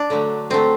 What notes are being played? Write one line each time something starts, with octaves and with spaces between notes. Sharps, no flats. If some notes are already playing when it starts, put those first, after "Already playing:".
Already playing: D4
D3 F#3 A3
D3 F#3 A3 C4